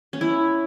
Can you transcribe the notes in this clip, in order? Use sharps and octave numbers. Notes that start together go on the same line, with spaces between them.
C#4
E4